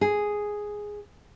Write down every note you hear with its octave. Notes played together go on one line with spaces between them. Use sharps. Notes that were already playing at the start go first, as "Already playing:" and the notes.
G#4